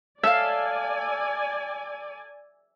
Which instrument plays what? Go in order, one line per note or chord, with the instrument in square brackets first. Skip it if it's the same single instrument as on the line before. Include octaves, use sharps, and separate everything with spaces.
[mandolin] A4 F5 [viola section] D5 G#5 [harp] E5